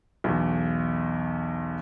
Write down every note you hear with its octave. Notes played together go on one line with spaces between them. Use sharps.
B1 E2